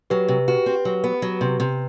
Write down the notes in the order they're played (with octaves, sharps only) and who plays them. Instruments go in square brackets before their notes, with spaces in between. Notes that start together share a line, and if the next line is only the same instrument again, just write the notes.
[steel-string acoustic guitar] F#3 [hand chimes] G4 B4
[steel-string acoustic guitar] C3 [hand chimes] G4 B4
[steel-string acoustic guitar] F#4 [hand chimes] G4 B4
[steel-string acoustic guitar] C4
F#3
B3
F#3
C3
C3